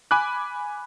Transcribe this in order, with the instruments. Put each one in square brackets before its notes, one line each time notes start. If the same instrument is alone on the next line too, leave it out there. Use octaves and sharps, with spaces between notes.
[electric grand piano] G#5 B5 D6 F#6